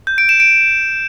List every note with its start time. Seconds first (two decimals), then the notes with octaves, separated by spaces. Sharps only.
0.07 G6
0.18 D7
0.29 E7
0.40 D7